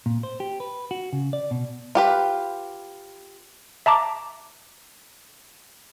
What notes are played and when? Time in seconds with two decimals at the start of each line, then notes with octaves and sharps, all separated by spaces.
0.06 A#2
0.23 C5
0.40 G4
0.60 B4
0.91 F#4
1.13 C#3
1.33 D5
1.51 B2
1.95 F4 G4 B4
3.86 E5 A5 A#5 D6